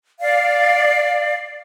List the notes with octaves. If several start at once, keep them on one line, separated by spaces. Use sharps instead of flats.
D5 F5